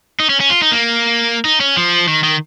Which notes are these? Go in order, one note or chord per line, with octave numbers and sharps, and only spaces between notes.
D#4
C#4
C#4
F4
D#4
A#3
D#4
C#4
F3
D#3
D#3